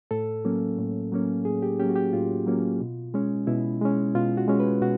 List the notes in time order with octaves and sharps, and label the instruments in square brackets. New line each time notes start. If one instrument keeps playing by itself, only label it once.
[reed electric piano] A2 A4
F#3 A#3 C#4
A2
F#3 A#3 C#4
A2 G#4
G4
F#3 A#3 C#4 G4
F#4
G4
A2 F4
F#3 A#3 C#4
B2
G#3 C#4
B2 E4
G#3 C#4
B2 F4
F#4
G#3 C#4
B4
B2 F#4